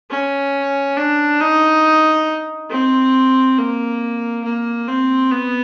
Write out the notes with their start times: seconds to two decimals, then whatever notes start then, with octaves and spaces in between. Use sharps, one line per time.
0.10 C#4
0.97 D4
1.40 D#4
2.70 C4
3.58 A#3
4.44 A#3
4.88 C4
5.31 B3